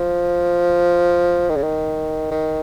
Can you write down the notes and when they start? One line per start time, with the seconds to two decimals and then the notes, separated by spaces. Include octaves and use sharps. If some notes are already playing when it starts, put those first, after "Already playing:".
Already playing: F3
1.50 D#3
1.56 C#3
1.63 D#3
2.31 D#3